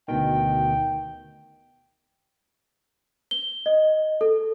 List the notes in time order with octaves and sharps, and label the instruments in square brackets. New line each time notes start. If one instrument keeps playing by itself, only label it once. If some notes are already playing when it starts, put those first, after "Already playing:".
[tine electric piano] D2 B2 D#3 [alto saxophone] G5
[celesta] G7
D#5
A4